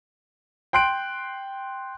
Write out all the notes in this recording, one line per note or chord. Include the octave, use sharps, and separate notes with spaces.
G5 C6 F#6 G6 D7